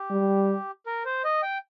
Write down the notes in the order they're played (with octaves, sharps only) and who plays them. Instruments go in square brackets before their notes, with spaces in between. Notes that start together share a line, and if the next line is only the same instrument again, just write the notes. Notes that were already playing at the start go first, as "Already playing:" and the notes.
Already playing: [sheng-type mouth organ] G4
[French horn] G3
[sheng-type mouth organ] A#4
C5
D#5
G5